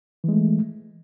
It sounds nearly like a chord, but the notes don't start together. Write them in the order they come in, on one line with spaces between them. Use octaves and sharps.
E3 G#3 A3